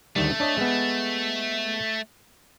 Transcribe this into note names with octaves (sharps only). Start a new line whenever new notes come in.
D2 D#3 G3 A3
D4 C#5 D#5
G#3 B3